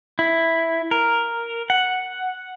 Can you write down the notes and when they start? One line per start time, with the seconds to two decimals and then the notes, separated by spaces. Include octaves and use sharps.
0.19 E4
0.91 A#4
1.70 F#5